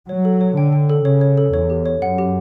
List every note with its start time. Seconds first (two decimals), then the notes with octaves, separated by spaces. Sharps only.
0.08 F#3 C#5
0.25 A4
0.41 C#5
0.57 D3 G5
0.73 G5
0.90 A4
1.05 C#3 C#5
1.21 C#5
1.38 A4
1.54 E2 C#5
1.70 G4
1.86 C#5
2.02 F#2 F#5
2.18 G4